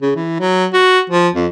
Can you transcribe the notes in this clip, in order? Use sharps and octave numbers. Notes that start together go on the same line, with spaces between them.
C#3
E3
F#3
F#4
F3
F2